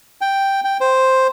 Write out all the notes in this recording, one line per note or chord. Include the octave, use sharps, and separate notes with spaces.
G5
G5
C5